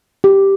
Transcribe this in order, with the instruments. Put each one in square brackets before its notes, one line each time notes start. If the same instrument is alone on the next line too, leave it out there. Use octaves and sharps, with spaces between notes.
[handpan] G4